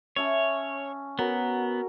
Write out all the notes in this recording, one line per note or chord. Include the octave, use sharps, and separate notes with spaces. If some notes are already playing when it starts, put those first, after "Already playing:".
C#4 C#5 E5 A5
B3 F#4 A#4 C#5